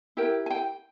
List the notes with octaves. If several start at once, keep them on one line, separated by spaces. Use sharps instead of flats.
E4 G4 A#4 G5
G#5
G5